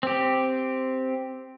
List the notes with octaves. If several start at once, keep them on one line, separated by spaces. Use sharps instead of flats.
C4 G4